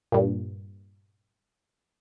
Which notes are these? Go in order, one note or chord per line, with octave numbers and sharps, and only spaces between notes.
G2 A#2